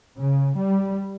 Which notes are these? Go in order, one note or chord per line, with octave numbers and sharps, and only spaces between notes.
C#3
G3